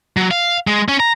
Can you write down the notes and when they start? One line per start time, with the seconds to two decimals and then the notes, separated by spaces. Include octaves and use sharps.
0.17 F#3
0.31 F5
0.67 G#3
0.88 C#4
1.00 A#5